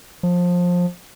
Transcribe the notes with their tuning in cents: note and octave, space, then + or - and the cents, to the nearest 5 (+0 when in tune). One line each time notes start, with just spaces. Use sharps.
F3 +20